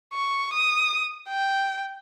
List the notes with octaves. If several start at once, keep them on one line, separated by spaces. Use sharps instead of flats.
C#6
D#6
G5